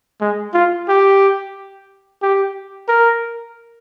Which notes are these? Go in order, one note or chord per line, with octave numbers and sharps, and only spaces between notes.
G#3
F4
G4
G4
A#4